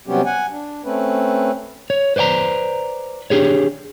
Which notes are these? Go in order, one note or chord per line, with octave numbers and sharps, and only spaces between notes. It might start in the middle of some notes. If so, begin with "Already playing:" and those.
C3 F#3 G3 B3 C#4 G4
F#5 G#5
D4
A3 C4 C#4 B4
C#5
B4 C5 D5 G5 A#5
D4 G4 G#4 C#5